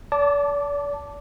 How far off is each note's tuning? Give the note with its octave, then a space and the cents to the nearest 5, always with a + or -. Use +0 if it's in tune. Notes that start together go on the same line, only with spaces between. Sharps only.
D5 -40 A5 +0 D6 -5